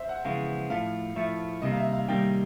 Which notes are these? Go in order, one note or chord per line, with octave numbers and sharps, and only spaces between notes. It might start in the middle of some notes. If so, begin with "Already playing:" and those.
Already playing: C5 E5
F#5
F2 C#3 E3 G#3 B3 F5
A2 F3 A3 F5
A2 F3 A3 E5
C2 C3 D#3 G3 A#3 D#5
F5
E5
F5
C2 C3 D#3 G3 A#3 G5